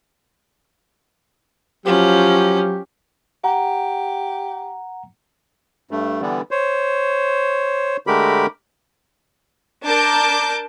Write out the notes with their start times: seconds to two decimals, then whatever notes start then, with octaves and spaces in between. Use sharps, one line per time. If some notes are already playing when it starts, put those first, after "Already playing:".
1.86 F3 F#3 C#4 G4
3.44 G4 F#5 A#5
5.91 G2 A3
6.22 D3 E3 G3 B3
6.51 C5 C#5
8.07 D3 G#3 A3 G4 A#4 B5
9.86 D4 A#4 A5 D6 G6